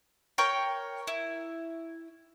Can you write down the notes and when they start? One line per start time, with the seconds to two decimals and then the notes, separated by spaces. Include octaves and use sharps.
0.38 A#4 C#5 G5
1.07 E4